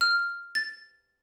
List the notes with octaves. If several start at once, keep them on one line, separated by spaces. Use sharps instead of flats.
F6
A6